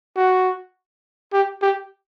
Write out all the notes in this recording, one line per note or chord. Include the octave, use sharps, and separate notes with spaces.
F#4
G4
G4